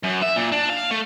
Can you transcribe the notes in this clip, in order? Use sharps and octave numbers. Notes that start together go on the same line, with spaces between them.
F#2
E5
A#2
D4
F5
A3